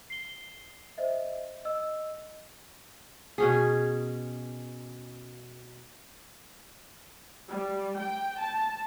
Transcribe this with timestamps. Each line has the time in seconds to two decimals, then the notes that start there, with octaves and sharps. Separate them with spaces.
0.10 C7 G7
0.98 C5 D#5 E5
1.65 D#5 E6
3.38 B2 C#4 G#4
7.50 G3
8.00 G5
8.40 A5